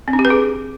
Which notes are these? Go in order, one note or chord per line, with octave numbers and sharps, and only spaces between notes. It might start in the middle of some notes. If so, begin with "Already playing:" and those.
C4
D4
G4
B4
G#4